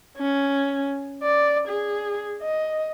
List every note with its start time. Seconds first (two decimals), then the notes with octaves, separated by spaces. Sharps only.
0.17 C#4
1.23 D5
1.67 G#4
2.42 D#5